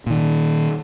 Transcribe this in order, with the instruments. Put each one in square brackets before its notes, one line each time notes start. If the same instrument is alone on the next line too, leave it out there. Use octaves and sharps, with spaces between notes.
[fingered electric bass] A#2 D#3